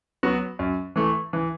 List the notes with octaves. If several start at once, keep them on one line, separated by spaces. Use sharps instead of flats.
F#3 B3 F#4
F#2
E3 A3
E3